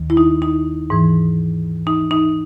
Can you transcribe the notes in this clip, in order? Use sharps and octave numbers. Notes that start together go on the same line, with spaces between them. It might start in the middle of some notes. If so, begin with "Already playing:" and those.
Already playing: D#2 D#3
E4
D#4
D#4
G#2 E3
D#4
D#4